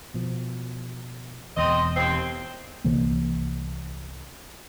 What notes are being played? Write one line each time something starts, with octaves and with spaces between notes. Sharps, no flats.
B2 F3
E1 E2 C4 C5 D#5
D#2 F3 C4
C2 C3 E3 A#3